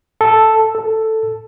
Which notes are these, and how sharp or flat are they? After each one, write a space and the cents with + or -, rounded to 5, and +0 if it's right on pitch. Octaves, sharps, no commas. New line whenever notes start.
A4 +0
A4 +5